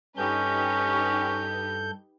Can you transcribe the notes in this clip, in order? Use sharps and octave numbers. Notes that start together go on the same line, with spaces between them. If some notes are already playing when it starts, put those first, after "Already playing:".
G2 C#4 D#4 G4 A4 B4 G6